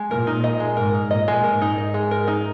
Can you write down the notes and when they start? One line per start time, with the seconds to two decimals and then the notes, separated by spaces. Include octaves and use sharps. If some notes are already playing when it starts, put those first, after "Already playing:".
Already playing: G#3
0.10 A#2 A#4
0.27 D#4
0.44 D#5
0.60 G#3
0.77 G#2 A#4
0.94 D#4
1.11 A#2 D#5
1.28 G#3
1.44 G#2 A#4
1.62 D#4
1.78 D#5
1.94 G#3
2.11 A#4
2.28 D#4